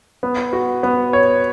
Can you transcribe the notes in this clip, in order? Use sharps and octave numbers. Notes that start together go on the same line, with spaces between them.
B3
F#4
B3
C#5